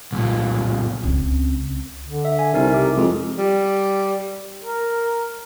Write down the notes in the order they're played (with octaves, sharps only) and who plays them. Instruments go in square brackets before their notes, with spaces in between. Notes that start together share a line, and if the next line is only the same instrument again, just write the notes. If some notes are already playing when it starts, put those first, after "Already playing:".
[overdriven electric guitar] C2 A#2
[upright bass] C#2 C4
[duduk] D3
[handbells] E5
G#5
[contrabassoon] C2 [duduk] C3 [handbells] D#4 A#4
[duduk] C3 [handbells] D6
[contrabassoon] F2 [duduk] G#3
[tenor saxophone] G3
[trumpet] A#4